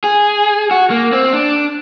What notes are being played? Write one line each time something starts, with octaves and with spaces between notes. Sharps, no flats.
G#4
F#4
A#3
C4
D4